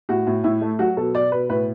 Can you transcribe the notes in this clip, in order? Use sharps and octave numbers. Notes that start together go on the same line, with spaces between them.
A2 F#4
A2
A2 E4
A3
F#3 F#4
B2 A4
B2 D5
B2 B4
A2 B4